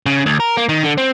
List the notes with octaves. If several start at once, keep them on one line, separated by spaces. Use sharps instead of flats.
C#3
D2
A#4
A#3
D#3
D3
C4